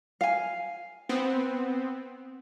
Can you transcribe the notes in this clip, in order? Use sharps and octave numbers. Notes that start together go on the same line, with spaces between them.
F5 G#5
B3 C4